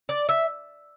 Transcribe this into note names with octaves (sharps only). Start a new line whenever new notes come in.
D5
E5